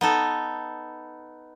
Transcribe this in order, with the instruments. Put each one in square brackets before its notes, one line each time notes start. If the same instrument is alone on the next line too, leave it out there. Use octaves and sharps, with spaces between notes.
[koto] B3 D#4 A4